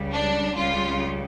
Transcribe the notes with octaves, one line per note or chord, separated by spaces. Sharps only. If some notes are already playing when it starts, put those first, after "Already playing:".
Already playing: C#2 C#3 G3
D4
C#2 C#3 G3 F4